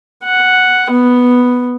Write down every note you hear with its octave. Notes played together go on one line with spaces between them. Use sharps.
F#5
B3